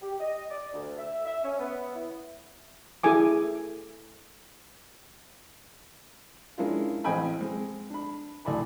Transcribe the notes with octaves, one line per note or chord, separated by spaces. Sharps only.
G4
D#5
D5
D2
E5
E5
C#4
B3
E4
E4 G#4 A4 G#5 D6
G#3 A#3 C#4 D4 E4 F4
A1 C4 D#5 G5 G#5 B5
G#3 C4
D4 B5
D2 A2 D5 G#5 B5